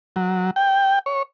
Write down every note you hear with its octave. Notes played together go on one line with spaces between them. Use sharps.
F#3
G5
C#5